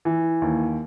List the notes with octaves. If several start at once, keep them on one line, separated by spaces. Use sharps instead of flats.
E3
D#2